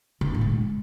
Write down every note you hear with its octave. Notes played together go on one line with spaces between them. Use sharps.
D3
C4
A2
G#3